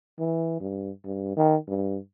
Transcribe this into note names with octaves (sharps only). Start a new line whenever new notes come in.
E3
G2
G2
D#3
G2